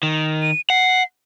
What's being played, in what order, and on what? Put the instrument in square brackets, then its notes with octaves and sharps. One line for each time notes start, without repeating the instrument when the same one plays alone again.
[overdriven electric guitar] D#3
[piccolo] D#7
[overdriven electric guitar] F#5 [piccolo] C7